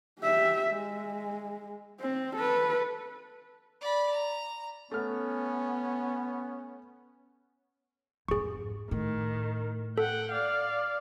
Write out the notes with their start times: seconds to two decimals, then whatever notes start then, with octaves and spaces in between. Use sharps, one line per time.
0.21 G4 E5
0.71 G#3
2.01 C4
2.37 A4 B4
3.81 D5 B5
4.12 A#5
4.91 A3 B3 C#4 F6
8.28 F2 G#2 G#4 C#6
8.91 A2 D#3
9.98 A4 F#5 G5
10.32 D5 F5